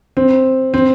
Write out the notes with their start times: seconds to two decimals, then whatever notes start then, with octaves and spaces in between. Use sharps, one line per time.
0.17 C4
0.74 C4